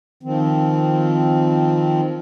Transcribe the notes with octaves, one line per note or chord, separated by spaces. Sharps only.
D#3 F3 C4